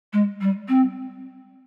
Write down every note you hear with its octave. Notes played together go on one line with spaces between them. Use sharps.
G#3
G3
C4